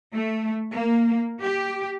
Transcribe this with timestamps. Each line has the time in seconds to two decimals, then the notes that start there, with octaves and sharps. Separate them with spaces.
0.14 A3
0.74 A#3
1.43 G4